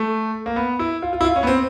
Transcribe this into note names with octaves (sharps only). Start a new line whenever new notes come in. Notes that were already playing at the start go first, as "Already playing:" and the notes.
Already playing: A3
A#3
B3
E4
F4
F4
E4
F4
C#4
B3
C4